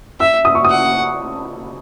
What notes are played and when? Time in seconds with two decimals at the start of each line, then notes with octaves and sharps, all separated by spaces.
0.20 E5 E6
0.45 D#6
0.55 C#6
0.65 D#6
0.70 F#5